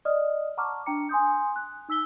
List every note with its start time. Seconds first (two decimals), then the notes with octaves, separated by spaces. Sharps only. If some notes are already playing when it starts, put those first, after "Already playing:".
0.05 D5 D#5 D#6 F6
0.57 F#5 A5 A#5 C#6 D6 F6
0.86 D4 G5 A#5 C#7
1.09 G#5 C6 D#6 G6
1.56 F#6
1.89 D#4 E6 B6 G7